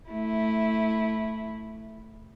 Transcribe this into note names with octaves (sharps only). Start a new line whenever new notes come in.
A3 E4